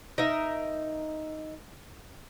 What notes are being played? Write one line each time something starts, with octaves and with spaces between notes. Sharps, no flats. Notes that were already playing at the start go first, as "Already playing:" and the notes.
D#4 A#4 E5